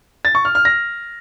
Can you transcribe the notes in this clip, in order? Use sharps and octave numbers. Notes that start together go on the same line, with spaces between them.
A6
C#6
F6
F6
A#6